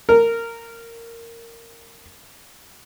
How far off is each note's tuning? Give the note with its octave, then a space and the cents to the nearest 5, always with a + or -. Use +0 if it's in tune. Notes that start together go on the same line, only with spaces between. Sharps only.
A#4 -15